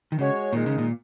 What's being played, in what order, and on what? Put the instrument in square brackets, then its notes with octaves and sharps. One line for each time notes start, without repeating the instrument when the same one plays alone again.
[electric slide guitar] D#3
[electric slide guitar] C#3 [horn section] G#3 F#4 C#5
[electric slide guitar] A#2 [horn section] D#3 G#3 D#4
[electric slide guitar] C#3
A#2